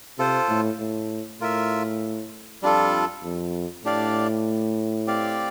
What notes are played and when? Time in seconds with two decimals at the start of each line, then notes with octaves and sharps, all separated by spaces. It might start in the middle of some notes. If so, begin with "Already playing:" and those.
0.18 C3 F4 A4 C5
0.49 A2
0.80 A2
1.41 A2 F4 A#4 E5
2.62 F2 G3 D4 F4 A4
3.24 F2
3.85 A2 D4 G4 D5 F5
5.07 C4 G4 D5 F5